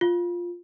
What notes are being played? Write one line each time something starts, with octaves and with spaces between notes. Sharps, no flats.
F4